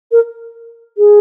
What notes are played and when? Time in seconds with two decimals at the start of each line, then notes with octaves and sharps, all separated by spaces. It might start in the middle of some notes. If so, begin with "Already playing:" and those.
0.12 A#4
0.98 G#4